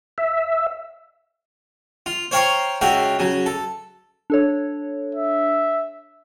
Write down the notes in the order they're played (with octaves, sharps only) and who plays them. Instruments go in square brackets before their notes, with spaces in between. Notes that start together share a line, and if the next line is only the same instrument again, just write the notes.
[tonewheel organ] E5
[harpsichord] F4
C5 C#5 F5 G5 A#5 C#6
C#2 F#4 E5 F5 G5
C#3 F#3
A4
[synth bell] D4 A4 C#5
[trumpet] E5